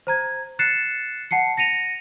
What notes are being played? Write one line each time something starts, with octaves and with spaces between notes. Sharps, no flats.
C5 A#5 G#6
F#6 A6 C7 C#7 E7
F#5 A5 C7 C#7
A#6 C#7 D#7 F7